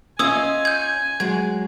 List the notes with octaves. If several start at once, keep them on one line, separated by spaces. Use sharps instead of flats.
C#4 F4 D#5 G#5 D#6 E6 G#6
G6 G#6
F#3 G#3 G#6